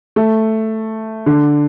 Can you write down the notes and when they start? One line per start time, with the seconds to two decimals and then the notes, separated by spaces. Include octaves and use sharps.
0.16 A3
1.26 D3